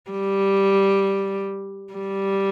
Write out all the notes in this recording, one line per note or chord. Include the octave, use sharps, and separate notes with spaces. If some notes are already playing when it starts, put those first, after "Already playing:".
G3
G3